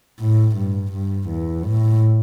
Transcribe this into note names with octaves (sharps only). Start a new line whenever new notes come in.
A2
G2
G2
E2
A2